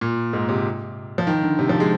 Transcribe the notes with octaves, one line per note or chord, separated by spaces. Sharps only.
A#2
G#2
C3
F3
D#3
D3
C3
F3
G#3